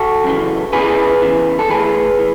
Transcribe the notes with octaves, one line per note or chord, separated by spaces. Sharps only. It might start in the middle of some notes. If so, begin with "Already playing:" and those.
Already playing: F#4 A4
F#2 C#3 E3
E2 C#3 E3 G#4 B4
E2 C#3 E3
A4
A2 E3 G#4 B4
E3